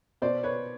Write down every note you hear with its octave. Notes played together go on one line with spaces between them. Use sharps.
B2 C5 D5
B4 C#5